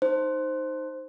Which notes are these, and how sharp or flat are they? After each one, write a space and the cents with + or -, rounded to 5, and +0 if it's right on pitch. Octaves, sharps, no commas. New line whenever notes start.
D#4 +0 C5 +0